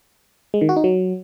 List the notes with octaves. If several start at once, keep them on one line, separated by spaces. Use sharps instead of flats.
G#3
D#3
F#4
D#4
F#3